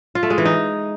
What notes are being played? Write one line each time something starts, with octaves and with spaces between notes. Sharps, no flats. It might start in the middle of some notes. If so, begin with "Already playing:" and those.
F4
A3
G#3
E3
D#4